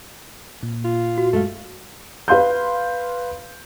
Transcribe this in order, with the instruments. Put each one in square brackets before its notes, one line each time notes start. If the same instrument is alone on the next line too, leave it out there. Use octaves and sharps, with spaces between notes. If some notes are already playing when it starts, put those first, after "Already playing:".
[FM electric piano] A#2
[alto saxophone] F4
[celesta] F#4
[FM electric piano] F#2 G#3 F5 [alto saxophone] A3
[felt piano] B4 F5 C6 G6